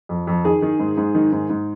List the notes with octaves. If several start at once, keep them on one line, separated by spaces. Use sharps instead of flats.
F2
F2
D#3 G#4
D#3
G#2
G#2
D#3
G#2
G#2